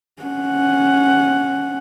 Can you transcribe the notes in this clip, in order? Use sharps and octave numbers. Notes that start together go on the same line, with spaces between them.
C#4 F#5